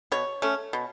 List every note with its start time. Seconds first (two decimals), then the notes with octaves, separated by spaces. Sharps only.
0.12 B2 C#5
0.42 A3 C#4
0.73 B2